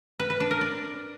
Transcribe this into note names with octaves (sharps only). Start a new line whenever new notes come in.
B4
B4
D4
A#4
D5